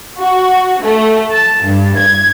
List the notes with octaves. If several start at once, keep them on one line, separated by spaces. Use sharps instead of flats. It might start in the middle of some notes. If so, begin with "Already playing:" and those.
F#4
A3
A5
G2
G#6